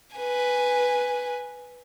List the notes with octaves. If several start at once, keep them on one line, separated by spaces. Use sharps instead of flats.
B4 G#5